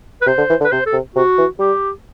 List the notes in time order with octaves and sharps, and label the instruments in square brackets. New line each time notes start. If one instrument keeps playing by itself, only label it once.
[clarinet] B4
[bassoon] C3 [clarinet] C5
[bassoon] D3
E3
D3
[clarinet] B4
[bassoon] C3 [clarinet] C5
[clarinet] A4
[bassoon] C3
[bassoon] C3 [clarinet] F#4
[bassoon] E3
[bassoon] G3 [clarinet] G4